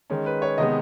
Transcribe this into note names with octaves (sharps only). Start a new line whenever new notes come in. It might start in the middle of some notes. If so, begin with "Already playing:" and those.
D#3 G#3 C#4
B4
C#5
C3 D#3 G#3 B3 D#5